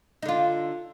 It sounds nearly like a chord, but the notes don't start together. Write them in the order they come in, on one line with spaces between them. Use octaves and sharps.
D#4 D3 F4